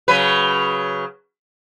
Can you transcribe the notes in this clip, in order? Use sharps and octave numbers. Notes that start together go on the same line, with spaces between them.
C#3 F#3 B4